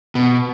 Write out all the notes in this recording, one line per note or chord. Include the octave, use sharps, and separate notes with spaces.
B2